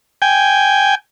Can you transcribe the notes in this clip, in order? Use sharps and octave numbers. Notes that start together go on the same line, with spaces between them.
G5 G#5